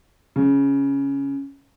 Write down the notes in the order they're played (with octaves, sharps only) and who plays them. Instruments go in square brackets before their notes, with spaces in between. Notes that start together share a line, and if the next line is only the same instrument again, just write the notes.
[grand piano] C#3